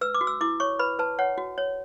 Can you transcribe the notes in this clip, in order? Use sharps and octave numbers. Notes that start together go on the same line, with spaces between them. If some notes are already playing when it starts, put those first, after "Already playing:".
B4 E6
D6
F#4
E6
E4 D6
C#5 C#6
B4 B5
B4 A5
C#5 F#5
F#4
C#5